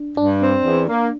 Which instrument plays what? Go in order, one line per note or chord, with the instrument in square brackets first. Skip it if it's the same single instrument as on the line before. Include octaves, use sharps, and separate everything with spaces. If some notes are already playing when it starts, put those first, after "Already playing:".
Already playing: [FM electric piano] D4
[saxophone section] G2 [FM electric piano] D4
[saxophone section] C4
E2
A#3